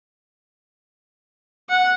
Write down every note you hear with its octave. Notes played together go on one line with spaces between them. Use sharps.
F#5